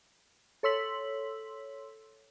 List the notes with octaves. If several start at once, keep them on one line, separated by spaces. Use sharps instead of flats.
A4 C#5 C6 E6 B6 F#7